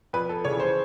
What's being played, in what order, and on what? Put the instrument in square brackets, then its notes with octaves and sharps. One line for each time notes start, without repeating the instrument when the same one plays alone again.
[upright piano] F2 B4
A4
C#3 E3 C#5
C5